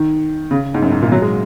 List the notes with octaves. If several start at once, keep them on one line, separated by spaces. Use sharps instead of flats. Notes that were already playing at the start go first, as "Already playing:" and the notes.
Already playing: D#3
C#3
G#2
F#2
G#2
A#2
F#3
G#3